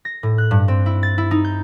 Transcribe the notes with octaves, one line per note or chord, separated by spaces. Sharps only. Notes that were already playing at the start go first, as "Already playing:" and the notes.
A#6
A2
F#6
G2
C4
E4
A6
E4
D#4
G6